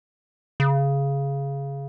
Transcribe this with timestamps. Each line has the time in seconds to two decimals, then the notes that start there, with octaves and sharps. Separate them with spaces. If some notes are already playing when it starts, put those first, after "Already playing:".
0.60 C#3